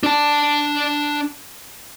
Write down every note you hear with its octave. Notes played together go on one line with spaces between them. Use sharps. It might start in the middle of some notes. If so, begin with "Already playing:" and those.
D4 A5